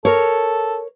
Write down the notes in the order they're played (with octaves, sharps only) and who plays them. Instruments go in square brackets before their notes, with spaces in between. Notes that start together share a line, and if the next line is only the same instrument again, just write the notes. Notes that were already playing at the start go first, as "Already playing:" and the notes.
[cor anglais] A4 [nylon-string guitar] A#4 C#5